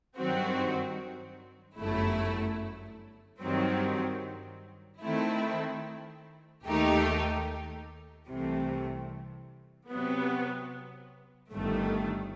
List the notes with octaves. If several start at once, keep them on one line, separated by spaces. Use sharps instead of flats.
G2 D#3 F#3 C4 F#4
G1 F#2 F#3 A3 E4
G2 D#3 F#3 C4
D#3 A3 C4 E4
D#2 D#3 A3 D#4 G4
C2 C3 E3 A3
C3 F#3 B3
G1 G2 D#3 A3